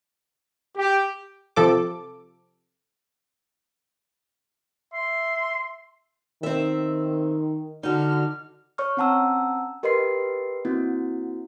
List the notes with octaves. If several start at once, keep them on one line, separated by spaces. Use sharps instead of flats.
G4
C3 F3 A4 D6
E5 C6
D#3 C4 E5
D3 D#4 F#4 F6
C#5 C#6 F6
C4 C#4 F#5 A5 A#5 E6
G4 A#4 B4 D#5 C6 C7
A#3 C4 E4 F#4